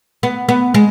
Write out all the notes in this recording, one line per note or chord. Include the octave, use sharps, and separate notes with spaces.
B3
B3
G#3